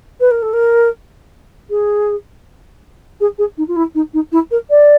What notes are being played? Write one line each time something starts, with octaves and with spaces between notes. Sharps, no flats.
B4
A#4
A4
A#4
G#4
G#4
G#4
D#4
F4
E4
D#4
D#4
E4
A#4
D5